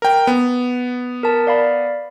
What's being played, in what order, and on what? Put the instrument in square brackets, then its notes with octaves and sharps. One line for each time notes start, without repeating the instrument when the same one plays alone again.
[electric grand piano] A#4 G5
B3
[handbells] A#4 A5
D5 F5 B5